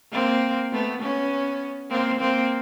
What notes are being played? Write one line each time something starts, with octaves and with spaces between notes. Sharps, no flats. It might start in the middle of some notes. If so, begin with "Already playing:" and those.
A#3 C4
A3 B3
B3 C#4
A#3 C4
A#3 C4